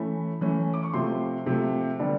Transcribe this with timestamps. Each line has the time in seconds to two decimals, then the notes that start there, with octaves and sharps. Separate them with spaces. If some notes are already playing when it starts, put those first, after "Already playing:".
Already playing: E3 A3 C#4 B5
0.41 E3 A3 C#4
0.74 D6
0.83 C#6
0.94 C3 F3 A3 C6
1.46 C3 F3 A3
2.00 D3 G3 B3 D4